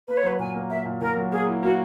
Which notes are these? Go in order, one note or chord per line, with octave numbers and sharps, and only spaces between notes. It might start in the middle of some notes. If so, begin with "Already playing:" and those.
A#3 B4
C#5
F#3 B4
A#2 G#5
A#3
A#3 E5
A#2
A#2 A#4
F#3
A#3 G#4
E4
A#3 F#4